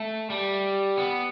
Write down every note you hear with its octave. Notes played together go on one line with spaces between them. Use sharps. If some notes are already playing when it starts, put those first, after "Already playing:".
Already playing: A3
G3
B3